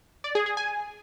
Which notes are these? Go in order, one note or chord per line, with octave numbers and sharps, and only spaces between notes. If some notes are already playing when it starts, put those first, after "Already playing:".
D5
G#4
G#4
G#5